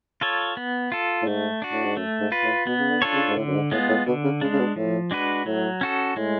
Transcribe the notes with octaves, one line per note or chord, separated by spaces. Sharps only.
F4 A4 C#5
B3
F4 A4
A2
G#2 A3
D4 F#4
A2
G#2
F#2 A3
G#2
F4 B4
A2
B2 B3
C#3
D3
D4 F4 A4 C#5
C#3
G#2
A2 D3
F#2
G#2
A2 G#3 B3 F4
A2
B2 D3
C#3
C#3 G#3 D4
C#3
B2
A2 F3
G#3 D4 F#4 B4
A2 F#3
C#4 F#4 A4
A2 G#3